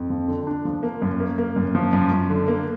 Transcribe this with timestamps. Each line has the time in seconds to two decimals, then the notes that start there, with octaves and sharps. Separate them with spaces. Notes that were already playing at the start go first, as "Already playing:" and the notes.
Already playing: F2
0.10 F3
0.28 D3
0.47 D4
0.65 F3
0.83 A#3
1.02 F#2
1.20 A#3
1.38 A#3
1.56 F#2
1.75 F3
1.93 F#2
2.11 F#2
2.30 D3
2.48 A#3